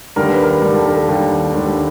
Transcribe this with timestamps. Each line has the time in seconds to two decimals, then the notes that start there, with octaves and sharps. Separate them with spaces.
0.16 D#2 D3 G3 A#4
0.30 B4
0.43 A#4
0.62 D#2 D3 G3
0.74 A4
0.85 A#4
0.96 A4
1.08 D#2 D3 G3
1.54 D#2 D3 G3